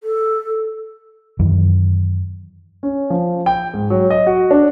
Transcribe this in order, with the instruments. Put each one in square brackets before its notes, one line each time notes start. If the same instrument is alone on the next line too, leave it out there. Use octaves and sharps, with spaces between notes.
[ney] A4
[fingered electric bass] F#2 D#3 E3
[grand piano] C#4
F3
G5
G#2
F#3
D#5
F#4
D4